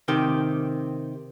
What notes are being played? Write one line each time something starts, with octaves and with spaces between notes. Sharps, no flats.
C3 D#3 G4